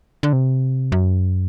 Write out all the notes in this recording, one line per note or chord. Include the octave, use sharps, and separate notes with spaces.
D3
C3
F#2